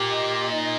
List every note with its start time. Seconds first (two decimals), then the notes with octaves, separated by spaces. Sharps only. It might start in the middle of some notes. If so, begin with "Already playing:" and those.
Already playing: A#2 G4
0.09 D#5
0.50 D#4